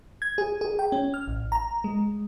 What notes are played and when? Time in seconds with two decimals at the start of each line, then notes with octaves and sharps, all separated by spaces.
0.22 G#6
0.38 G#4
0.61 G#4
0.79 G5
0.92 C#4
1.14 F6
1.27 A1
1.52 A#5
1.84 G#3